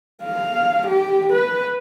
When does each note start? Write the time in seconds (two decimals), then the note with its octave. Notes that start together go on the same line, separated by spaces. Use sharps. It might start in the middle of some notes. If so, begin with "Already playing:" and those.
0.23 F5
0.87 G4
1.33 B4